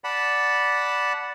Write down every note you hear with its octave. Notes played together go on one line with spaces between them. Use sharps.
D5 F#5 A5 B5